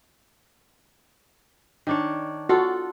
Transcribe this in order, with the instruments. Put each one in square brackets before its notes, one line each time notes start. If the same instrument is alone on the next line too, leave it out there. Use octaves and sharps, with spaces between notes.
[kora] D#3 D4 C#5
[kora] F4 A4 F#5 [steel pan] F#4